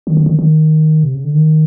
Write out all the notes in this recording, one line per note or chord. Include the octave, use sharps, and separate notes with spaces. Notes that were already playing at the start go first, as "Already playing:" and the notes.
D#3
D3
D#3
D#3
C3
C#3
D3
D#3